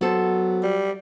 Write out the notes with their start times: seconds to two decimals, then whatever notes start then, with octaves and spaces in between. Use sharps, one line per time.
0.01 F#3 B3 A4 C5
0.63 G3